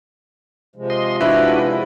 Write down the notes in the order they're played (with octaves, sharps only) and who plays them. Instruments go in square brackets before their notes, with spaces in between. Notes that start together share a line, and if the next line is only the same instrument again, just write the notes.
[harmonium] C3 F3 G#3
[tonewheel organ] D#5 C6
[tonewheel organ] D4 F#4 B4 [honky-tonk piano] E4